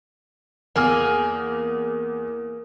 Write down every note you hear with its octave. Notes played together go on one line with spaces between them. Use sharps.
E2 A#3 G#4 F6